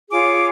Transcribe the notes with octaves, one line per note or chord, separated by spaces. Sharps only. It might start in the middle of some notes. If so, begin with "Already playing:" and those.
F4 G#4 C#5 D6